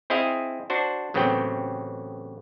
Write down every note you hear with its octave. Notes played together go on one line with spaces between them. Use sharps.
C4 E4 G#4 D#5 F5
D4 F#4 C5
A1 C#3 F#3 B3 C4 G5